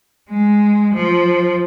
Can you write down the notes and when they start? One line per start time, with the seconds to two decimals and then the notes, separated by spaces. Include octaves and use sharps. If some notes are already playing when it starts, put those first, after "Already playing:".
0.30 G#3
0.94 F3